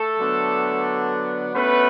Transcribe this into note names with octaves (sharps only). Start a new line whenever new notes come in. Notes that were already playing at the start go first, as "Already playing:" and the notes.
Already playing: A3 A4
D3 F#3 B3 D4
B2 A3 B3 C#4 B4